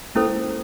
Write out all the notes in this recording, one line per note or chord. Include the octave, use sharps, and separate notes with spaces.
G#3 A#3 C#4 E4 A4 C5